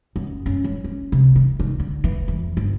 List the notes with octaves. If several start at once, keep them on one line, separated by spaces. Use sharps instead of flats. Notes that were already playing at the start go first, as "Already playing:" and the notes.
F#2
C#4
F#3
C#4
C3
D#3
D#3
D3
E3
F2
G1